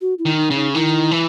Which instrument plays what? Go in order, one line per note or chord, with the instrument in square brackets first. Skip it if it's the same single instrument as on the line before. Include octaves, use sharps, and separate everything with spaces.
[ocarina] F#4
E4
[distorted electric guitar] D#3
[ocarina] D#4
[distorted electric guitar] C#3
[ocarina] D#4
[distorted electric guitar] D#3 [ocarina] E4
[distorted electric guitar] E3